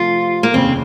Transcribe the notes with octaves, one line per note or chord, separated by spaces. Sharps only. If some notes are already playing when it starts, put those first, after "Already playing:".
Already playing: C3 F3 A3 F4
A#3
F1 D#2 C#3 C4